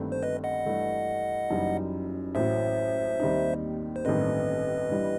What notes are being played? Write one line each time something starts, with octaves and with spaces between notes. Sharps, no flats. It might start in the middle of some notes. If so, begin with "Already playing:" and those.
Already playing: G1 G2 D#3 A3 C4
C5
B4 D#5
D#5 F#5
G2 E3 A3
F#1 F#2 E3 G3 D#4
A1 A2 F#3 C5 E5
D#2 D#3 G3 C4 D#4
C5
A1 G2 D#3 A3 C4 B4 D#5
G1 G2 E3 G3